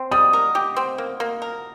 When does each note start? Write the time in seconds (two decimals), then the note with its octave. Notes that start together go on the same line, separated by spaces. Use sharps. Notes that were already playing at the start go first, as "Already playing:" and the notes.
Already playing: C4
0.12 G3 D#6
0.33 A#4
0.55 G4
0.77 C4
0.98 A#3
1.20 A#3
1.42 A#4